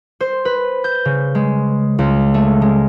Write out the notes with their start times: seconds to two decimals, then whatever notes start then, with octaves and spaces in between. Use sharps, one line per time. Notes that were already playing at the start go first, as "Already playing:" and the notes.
0.20 C5
0.45 B4
0.84 G6
1.05 C#3
1.35 G#3
1.99 C#2
2.34 A3
2.61 G#3